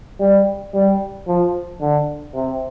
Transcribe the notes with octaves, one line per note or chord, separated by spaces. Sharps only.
G3
G3
F3
D3
C3